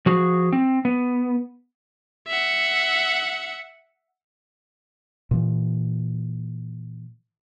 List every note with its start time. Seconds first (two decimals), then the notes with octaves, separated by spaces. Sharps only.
0.06 F3 F#4 G#4
0.53 C4
0.85 B3
2.28 E5 F#5
5.31 A#2 E3